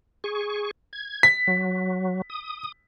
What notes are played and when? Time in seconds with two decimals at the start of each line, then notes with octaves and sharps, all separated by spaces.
0.24 G#4 C#6
0.93 G#6
1.23 B6
1.47 F#3
2.30 D#6